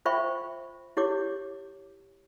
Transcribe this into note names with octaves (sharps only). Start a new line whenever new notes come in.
F4 C5 E5 G5 B5 C#6
E4 G4 C#5 D6